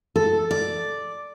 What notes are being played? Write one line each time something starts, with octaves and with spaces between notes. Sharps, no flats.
A4
D5